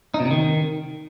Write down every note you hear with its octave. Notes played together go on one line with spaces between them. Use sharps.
D#4
B2
C3
D#3